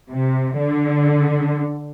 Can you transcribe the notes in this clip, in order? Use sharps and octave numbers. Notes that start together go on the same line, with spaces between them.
C3
D3